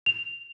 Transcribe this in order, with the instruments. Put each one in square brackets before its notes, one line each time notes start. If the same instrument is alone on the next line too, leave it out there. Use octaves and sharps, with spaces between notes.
[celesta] F7